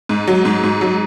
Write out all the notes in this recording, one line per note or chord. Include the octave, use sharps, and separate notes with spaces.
G#2
F#3
G#2
G#2
F#3